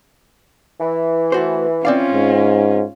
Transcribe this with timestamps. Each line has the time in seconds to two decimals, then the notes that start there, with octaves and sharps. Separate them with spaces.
0.80 E3
1.32 A3 F#4 C5
1.85 C4 C#4 F4 D5 F5
2.14 G#2